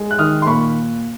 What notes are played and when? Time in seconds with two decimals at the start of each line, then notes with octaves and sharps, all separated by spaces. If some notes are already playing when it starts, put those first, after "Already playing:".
Already playing: G#3
0.11 F#6
0.19 D#3 D#6 F6
0.42 C6
0.47 A#2 B5 C#6